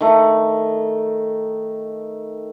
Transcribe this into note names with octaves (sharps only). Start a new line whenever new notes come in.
D#3 A3